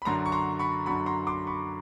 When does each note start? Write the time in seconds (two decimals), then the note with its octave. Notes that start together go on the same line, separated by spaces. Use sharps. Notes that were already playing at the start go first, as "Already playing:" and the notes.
0.02 B5
0.05 F#2 D3 F#3 A#5 C6
0.26 C#6
0.32 A#5 C6
0.59 B5 C#6
0.86 F#2 D3 F#3 B5 C#6
1.06 A#5 C6
1.27 C6 D6
1.47 B5 C#6